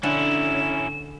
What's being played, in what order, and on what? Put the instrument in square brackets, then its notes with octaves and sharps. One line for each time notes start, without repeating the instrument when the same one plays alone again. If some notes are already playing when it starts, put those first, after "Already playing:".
[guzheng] D3 [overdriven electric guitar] C#4 E4 [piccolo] E7